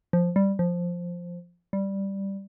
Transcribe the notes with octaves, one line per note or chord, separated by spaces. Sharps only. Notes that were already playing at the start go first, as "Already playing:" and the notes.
F3
G3
F3
G3